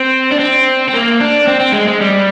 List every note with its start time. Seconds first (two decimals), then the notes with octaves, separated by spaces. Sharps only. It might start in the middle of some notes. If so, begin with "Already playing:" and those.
Already playing: C4
0.32 D4
0.39 C4
0.88 C4
0.94 A#3
1.21 D4
1.48 C4
1.61 C4
1.73 G#3
1.88 G#3
2.01 G3